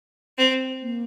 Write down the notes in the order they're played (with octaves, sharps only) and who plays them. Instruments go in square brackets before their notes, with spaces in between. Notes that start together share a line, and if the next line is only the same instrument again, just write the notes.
[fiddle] C4
[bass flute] A#3